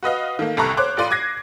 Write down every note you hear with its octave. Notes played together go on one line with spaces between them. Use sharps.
F#4 B4 D#5 F5
D#3 A3 A#3
G1 C2 A4 A#5 C#6 F#6
C5 C#5 D6 F#6
A1 F4 D5 C6 D#7
D6 F#6 G#6 A#6 C7